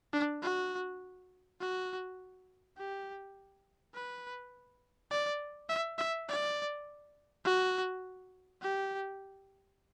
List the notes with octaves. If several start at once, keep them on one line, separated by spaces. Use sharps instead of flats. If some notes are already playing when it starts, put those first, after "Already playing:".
D4
F#4
F#4
G4
B4
D5
E5
E5
D5
F#4
G4